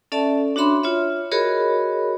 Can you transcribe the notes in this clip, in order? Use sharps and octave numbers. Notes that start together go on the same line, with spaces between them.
C#4 A4 D5 E5 A5
D4 F#4 C#5 E5 B5 C6
F4 C#5 E5
F#4 G#4 A#4 C#5 D#5 B5